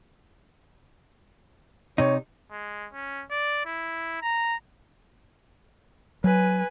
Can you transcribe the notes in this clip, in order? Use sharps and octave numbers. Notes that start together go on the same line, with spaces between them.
C3 D#4 C#5
G#3
C#4
D5
E4
A#5
F#3 B4 G#5